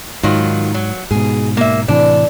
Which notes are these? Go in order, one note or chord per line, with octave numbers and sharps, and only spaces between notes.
G#2 D#3 F#3 F4
F#3
G#2 B2 G#4
A#3 E5
A2 C3 E3 D4